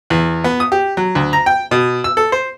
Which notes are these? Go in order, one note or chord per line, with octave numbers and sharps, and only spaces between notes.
E2
B3
D#6
G4
F#3
D2
A#5
G5
B2
E6
A4
C5